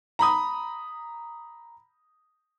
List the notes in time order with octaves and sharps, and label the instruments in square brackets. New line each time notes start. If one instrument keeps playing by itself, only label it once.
[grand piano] A#5 B5 D#6